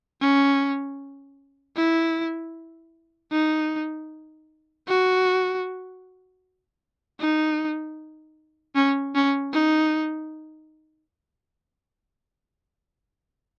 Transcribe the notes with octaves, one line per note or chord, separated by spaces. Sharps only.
C#4
E4
D#4
F#4
D#4
C#4
C#4
D#4